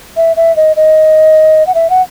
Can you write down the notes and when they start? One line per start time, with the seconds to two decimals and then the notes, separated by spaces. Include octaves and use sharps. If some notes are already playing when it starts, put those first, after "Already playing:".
0.17 E5
0.36 E5
0.56 D#5
0.76 D#5
1.67 F#5
1.74 E5
1.90 F#5